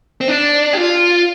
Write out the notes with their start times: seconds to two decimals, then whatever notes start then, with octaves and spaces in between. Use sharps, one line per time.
0.21 C4
0.28 D4
0.73 G4
0.77 F4